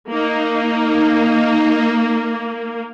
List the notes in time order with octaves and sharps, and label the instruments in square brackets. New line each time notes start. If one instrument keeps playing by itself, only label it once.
[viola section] A#3 [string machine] D#4